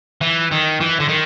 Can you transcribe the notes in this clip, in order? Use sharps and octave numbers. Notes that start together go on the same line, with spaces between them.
E3
D#3
E3
D3
D#3